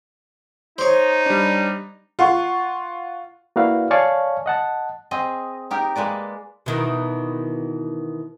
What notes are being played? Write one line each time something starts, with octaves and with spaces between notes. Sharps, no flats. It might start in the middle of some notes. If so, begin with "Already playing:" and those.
D#4 C5 C#5
G3 D4
F4 F#5 C#6
A#3 E4 F#4 B4 D5 F5
C#5 D5 F5 G#5 A5 C#6
D#5 F#5 A5
C4 G#4 D#5
D#4 G4 A#4
G#3 A#3 B4 D5
B2 D#3 E3